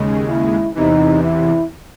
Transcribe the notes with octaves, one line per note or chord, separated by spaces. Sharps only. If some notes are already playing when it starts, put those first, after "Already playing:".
Already playing: D#2 C#3 G#3
E4
E2 C3 E3 D#4
E4